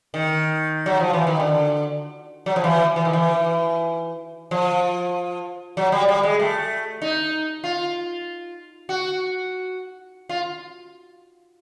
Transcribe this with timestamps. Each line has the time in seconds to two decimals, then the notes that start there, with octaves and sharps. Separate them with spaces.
0.14 D#3
0.86 F#3
1.00 F3
1.13 E3
1.27 D#3
1.40 D3
2.46 F#3
2.56 F3
2.64 E3
2.96 E3
3.05 D#3
3.13 E3
4.51 F3
5.77 F#3
5.92 G3
6.09 G3
6.23 G#3
6.40 A3
7.02 D#4
7.64 F4
8.89 F#4
10.29 F4